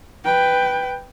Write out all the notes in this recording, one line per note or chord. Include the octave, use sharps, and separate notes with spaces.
B4 G5